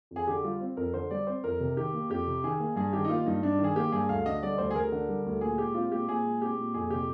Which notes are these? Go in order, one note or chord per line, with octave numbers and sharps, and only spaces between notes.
F2
G#4
D3 G4
G3 F4
C4
F2 A#4
D3 C5
G3 D5
C4 C5
F2 A#4
C3
D#3 G4
A#3
F2 G4
C3
D#3 G#4
A#3
G2 G#4
D#3 G4
D#4
A#3 F4
G2 D#4
G2 D4
D#3
G#4
A#3 G4
G2 G#4
D2 F5
D3 D#5
G3 D5
D2 C5
G#4
D2 A#4
D3
G3
D2
A#2 G#4
G#3 G4
C4 F4
A#2 G4
A#2 G#4
G#3
C4 G4
A#2
F2 G#4
C3 G4